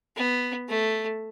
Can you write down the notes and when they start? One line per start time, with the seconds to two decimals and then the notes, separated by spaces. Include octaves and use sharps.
0.16 B3
0.69 A3